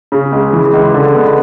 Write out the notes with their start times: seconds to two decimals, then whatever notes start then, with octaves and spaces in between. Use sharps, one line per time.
0.12 C#3
0.32 C#2
0.53 E3
0.73 C#2
0.94 D3
1.15 B3